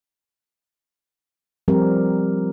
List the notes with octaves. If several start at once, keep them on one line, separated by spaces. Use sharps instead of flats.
F3 G3 C4 G4 A#4